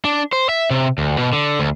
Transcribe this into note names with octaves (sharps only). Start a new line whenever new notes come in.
D4
C5
E5
C3
D2
B2
D3
D2